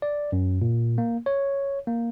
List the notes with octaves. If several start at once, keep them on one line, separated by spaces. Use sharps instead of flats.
D5
F#2
A#2
A#3
C#5
A#3